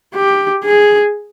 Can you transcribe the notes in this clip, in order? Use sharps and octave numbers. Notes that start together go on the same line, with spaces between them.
G4
G#4